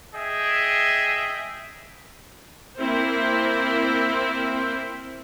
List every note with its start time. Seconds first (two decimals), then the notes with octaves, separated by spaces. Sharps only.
0.14 G#4 D#5 E5 G5
2.77 A#3 C4 E4 C5